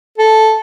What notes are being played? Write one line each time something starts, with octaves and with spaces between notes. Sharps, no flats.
A4